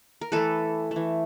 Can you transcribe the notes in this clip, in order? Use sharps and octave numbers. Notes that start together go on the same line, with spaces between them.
A#4
E3 A3 A4 B4
E3 A3